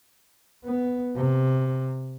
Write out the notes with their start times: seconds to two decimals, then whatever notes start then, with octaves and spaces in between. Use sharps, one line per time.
0.64 B3
1.17 C3